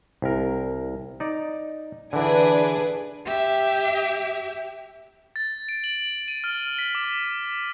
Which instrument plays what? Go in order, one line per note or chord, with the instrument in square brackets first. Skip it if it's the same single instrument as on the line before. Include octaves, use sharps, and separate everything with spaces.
[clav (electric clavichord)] C2 A#4
D#4 D5
[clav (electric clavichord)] D3 E3 [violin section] D4 G#4 B4
[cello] G4 E5
[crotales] A6
D7
F#7
D#7
F6
B6
D6